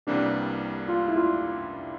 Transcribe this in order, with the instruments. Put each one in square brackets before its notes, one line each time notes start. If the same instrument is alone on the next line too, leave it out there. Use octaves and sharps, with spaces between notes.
[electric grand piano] C2 C3 E3 G3 A#3 [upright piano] D4
[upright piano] F4
E4
F4